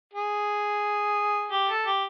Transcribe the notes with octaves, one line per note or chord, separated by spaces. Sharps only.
G#4
G4
A4
G4